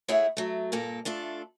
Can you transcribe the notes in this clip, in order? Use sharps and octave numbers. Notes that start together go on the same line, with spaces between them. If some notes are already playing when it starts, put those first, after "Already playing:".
A3 E4 G#4 C#5 E5 F#5
F#3 A3
G2 A#2 A#3 A4
A3 D4 F4 A4